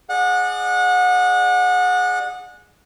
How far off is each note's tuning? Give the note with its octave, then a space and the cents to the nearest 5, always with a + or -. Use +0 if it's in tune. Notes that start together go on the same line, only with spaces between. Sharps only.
G#4 +0 D5 +30 F#5 -25